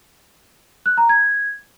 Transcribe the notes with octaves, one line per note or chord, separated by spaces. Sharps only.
F#6
A#5
G#6